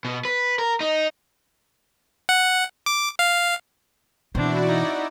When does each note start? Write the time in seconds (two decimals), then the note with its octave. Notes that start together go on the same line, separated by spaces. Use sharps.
0.05 B2
0.25 B4
0.59 A#4
0.80 D#4
2.29 F#5
2.86 D6
3.19 F5
4.35 B2 E3 C4 D4 E4 F#4 D5
4.67 D#4